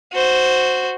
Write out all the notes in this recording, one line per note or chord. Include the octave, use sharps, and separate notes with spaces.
F#4 C5